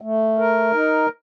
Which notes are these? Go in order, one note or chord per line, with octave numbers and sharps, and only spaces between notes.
A3
A#4
D#4